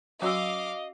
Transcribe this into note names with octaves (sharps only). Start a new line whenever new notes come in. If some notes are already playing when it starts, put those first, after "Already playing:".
F#3 C#4 F#4 D#5 F5 D6 E6